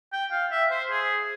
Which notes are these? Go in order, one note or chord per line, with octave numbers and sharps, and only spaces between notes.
G5
F5
E5
C5
G#4